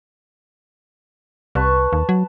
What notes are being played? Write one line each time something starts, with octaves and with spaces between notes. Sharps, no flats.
C2 B4 A5 C#6
D#2
F#3